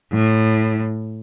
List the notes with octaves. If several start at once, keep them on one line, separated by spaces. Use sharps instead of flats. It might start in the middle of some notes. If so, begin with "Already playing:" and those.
A2